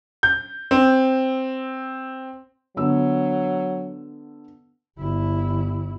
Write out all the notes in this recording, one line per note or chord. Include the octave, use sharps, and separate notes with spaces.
G6
C4
D3 F#3 B3 E6
G1 E4